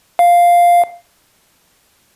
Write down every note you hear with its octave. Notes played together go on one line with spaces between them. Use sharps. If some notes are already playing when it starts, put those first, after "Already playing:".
F5